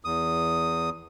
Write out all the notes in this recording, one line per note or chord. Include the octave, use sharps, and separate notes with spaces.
E2 D#6